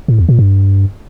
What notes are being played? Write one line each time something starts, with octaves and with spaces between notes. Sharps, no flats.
A2
E2
A#2
G2